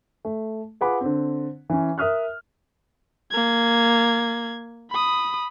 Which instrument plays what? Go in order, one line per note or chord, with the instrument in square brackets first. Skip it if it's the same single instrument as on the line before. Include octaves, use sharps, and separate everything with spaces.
[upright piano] A3
F4 G#4 B4 F#5 B5 D6
D3 C4
E3 C#4
A#4 E5 D#6 F6 F#6
[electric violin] A#3 G#6
B5 D#6